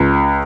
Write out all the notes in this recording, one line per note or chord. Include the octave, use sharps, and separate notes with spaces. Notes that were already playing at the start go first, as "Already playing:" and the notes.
Already playing: C#2